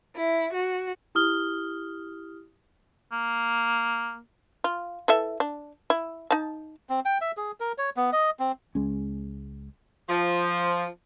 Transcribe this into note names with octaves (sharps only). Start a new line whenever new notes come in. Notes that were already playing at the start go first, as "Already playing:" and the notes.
E4
F#4
E4 G4 D#6 F6 G7
A#3
F4
E3 A4 E5
D4
E4
D#4 A5
C4
G5
E5
G#4
A#4
C#5
B3
D#5
C4
C#2 G#3 C#4
F3